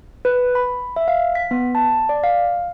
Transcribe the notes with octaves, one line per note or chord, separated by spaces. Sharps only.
B4
B5
E5
F5
B6
B3
A5
D5
F5